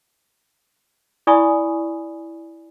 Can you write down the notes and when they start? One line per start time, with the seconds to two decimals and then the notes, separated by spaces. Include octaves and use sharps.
1.27 E4 D5 G#5 B5 C#6 D#6